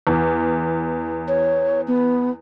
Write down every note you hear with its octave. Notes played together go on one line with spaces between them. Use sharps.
E2
C#5
B3